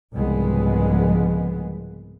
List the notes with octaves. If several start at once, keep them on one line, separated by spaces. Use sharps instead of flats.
C2 G#2 C#3 F3 G#3 B3